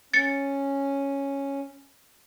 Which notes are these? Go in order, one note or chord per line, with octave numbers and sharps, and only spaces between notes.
C#4 A6 C#7